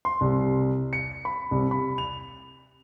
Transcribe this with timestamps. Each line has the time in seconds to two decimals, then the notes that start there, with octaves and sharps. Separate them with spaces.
0.05 C6
0.21 C2
0.93 C#7
1.25 B5
1.51 C2
1.71 B5
1.98 F7